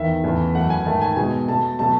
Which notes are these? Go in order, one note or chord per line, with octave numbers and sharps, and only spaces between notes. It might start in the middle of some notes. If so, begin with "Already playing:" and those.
Already playing: E2 D#3 E5
E2 C#3 E3 A3
F#2 E3 A3 F#5
G#5
G#2 D#3 A3 A5
G#5
B2 G#3 G#5
B2 A3 A5
B2 F#3 A3 A5